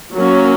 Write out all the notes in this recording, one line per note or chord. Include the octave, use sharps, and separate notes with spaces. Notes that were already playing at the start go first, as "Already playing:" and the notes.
F#3 A#3 C#4